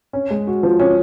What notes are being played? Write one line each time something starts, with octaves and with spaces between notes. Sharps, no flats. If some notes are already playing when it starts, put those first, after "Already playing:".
C#4
G#3
F#4
F3
C#4